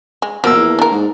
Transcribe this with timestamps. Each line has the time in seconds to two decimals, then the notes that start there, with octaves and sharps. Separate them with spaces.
0.22 G#3
0.44 B2 F3 A#3 E6
0.56 E2
0.79 D4 A#4
0.91 G#2